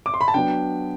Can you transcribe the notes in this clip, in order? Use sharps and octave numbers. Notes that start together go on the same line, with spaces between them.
D6
C6
B5
A5
F#3 B3 D4 G5